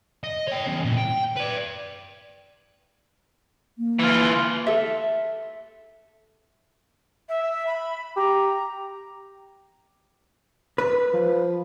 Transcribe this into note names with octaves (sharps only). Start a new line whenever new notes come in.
D#5
C#5 G5
E2 C#4
A#2 E3
G5
B4 D5
A#3
E3 F4
A4 E5
E5
B5
G4 A#5
B4
F3